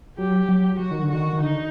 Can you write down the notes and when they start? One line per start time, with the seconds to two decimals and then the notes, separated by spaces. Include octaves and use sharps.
0.18 F#3 G4
0.49 F#3
0.79 F#3 F#4
0.91 D#3
1.03 D3
1.10 D#3 F#4
1.33 D#3
1.40 D3 D#4